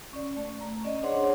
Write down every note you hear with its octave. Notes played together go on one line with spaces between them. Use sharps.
C#4 D5
A3
A#5
C#4 D5 D#5
D4 G#4 C5 C#5 F#5 C6